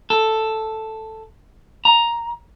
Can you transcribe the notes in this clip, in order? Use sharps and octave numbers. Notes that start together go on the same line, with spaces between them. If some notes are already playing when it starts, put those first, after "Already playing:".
A4
A#5